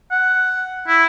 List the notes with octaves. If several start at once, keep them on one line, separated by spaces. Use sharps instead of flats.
F#5
E4